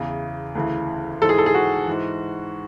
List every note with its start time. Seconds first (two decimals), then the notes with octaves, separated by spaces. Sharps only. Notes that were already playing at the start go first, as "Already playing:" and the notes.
Already playing: E2 C#3 E3
0.55 D2 C#3 E3
1.21 G#2 E3 A4
1.29 G#4
1.38 A4
1.46 G#4
1.54 F#4
1.87 G#2 E3